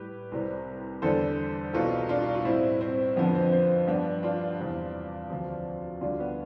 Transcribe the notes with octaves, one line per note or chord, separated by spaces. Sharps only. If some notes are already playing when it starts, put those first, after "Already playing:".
Already playing: A2 G3 G4 B4
C2 C3 G3
E2 D3 G3 A4 C5
C2 B2 G3 F4 A4
D4 F4
F4
A2 G3 C4 E4
C4
F2 D3 F3 B3
C4
C4
G2 F3 B3 D4
D4 F4
E2 C3 G3
D2 C3 F3
D2 D3 G3 D4 F4
B3